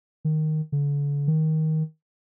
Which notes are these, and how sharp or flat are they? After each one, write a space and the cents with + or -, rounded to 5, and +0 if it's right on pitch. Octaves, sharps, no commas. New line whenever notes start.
D#3 -5
D3 -40
D#3 +15